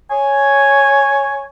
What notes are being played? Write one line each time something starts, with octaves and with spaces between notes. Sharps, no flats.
C#5 G#5